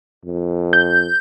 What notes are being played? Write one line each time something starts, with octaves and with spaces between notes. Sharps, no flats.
F2
G6